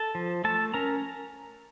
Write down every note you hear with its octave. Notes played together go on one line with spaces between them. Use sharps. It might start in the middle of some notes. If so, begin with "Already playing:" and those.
Already playing: A4 A5
F3
A3 A4 A5
C#4 A#4 A#5